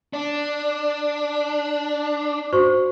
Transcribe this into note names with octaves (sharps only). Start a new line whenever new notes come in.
D4
F#4 C5 C#6